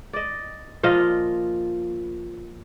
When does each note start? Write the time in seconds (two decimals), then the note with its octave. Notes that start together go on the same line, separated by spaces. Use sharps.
0.13 D5 D#5
0.83 A#2 F3 F4 D#5